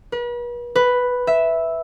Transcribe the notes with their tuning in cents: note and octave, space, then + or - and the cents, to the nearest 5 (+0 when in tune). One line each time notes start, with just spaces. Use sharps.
B4 -40
B4 +0
E5 -5